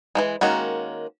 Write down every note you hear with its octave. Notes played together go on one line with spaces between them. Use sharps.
E3 F#3 G#3
D#3 G#3 A#3 C#4 F#4